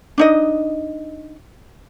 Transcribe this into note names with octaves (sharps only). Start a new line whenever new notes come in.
D4 D#4 D#5